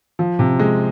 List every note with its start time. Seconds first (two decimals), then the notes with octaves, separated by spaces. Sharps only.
0.19 F3
0.39 C3
0.60 G#3